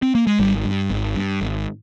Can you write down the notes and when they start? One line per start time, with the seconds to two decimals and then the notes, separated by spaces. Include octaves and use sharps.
0.02 C4
0.15 A#3
0.27 G#3
0.39 G#1 G3
0.65 G2
0.90 G#1
1.15 G2
1.41 G#1